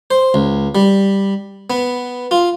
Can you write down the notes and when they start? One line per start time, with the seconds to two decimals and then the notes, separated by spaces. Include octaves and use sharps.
0.11 C5
0.34 C#2
0.75 G3
1.70 B3
2.31 F4